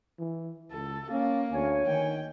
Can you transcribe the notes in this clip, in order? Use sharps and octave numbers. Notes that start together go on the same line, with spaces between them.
E3
C#2 A4
A#3 C#4
D2 C#5 G#5
D#3 G5